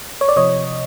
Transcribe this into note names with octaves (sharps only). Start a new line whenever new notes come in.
C#5
D5
C3 F3 C#5 D#5